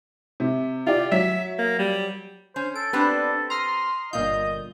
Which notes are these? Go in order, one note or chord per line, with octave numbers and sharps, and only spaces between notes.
C3
E4 F4 G4 D5
F#3 E5 B6
A#3
G3
C#4 C5
A4 D7
B3 C4 D4 G4 B4
A#5 C6 D#6 F6
G1 A#2 F4 D#5 G6